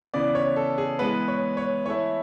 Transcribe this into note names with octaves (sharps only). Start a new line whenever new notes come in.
C#3 E3 B3 D5
C#5
A4
G#4
E3 G#3 B3 B4
C#5
C#5
E3 A3 E4 C#5